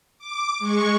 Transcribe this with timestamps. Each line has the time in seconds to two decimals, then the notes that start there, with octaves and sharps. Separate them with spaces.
0.18 D6
0.59 G#3 C#6